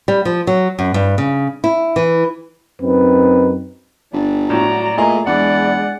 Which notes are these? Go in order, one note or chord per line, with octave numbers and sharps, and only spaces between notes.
G3
F3
F#3
F#2
G2
C#3
E4
E3
F#2 C4 D#4 B4
G1 D4
A2 F#4 D5 A#5
A#2 A3 E4 G#4 D#5 A#5
E2 G#3 D4 D5 F#5